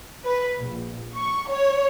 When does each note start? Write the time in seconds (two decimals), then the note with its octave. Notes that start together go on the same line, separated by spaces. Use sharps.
0.25 B4
0.58 A#1
1.16 C#6
1.50 C#5